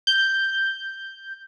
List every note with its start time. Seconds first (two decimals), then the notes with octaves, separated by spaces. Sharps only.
0.07 G6